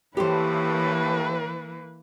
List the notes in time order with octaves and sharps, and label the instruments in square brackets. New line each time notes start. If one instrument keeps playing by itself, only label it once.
[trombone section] A2 [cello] E3 A#3 [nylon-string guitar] G4 A4 C5 [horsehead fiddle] B4